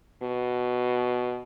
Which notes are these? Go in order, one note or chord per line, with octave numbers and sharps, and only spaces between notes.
B2